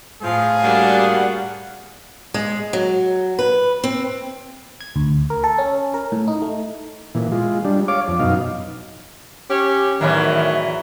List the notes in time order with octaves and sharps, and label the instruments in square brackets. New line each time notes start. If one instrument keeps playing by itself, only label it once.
[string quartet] A2 F5 [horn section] F3 [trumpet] G#4
[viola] G3 D4 [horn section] A#3 F#4 F#5
[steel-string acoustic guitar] G#3
F#3
B4
C4
[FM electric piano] G#6
D2
A#4
A4
C#4
A#4
A2
D#4
A3
[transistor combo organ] A#2 E3
G#3 F4
G3 D4
C#5 F5 D6
F2
F#2 B2 D#4 F5
[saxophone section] C#4 G4
[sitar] E2 E3 F#3 [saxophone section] A2 D#3